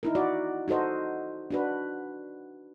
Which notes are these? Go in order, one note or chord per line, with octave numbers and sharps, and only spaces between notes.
D#4 E4 A#4
F#4 D5
D#4 F#4 A4 C5 D#5
D4 F#4 B4